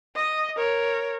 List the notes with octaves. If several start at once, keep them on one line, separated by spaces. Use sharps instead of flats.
D#5
A#4 C#5